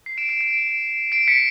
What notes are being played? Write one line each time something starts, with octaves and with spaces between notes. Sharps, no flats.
C7
D7 E7
C7 D7
C7 D7
C7 D7
B6 C#7